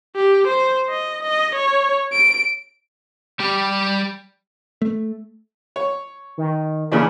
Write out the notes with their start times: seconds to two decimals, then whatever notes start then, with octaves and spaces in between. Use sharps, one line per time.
0.15 G4
0.47 C5
0.90 D#5
1.23 D#5
1.55 C#5
2.13 D7
3.40 G3 G4
4.82 A3
5.76 C#5
6.37 D#3
6.92 A#2 C#3 E3 D4